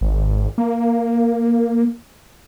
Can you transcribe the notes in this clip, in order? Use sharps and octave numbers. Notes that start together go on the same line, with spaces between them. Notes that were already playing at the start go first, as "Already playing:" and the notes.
G#1
A#3